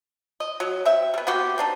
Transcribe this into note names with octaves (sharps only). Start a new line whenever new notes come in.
D#5
F#3
C4 E5
G3 B3
B3 C4 F#4 G4
C4 D4 D#4